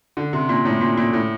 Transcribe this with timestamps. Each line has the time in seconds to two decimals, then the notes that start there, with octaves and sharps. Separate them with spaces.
0.17 D3
0.33 C3
0.49 A#2
0.65 A2
0.81 A#2
0.98 A#2
1.13 A2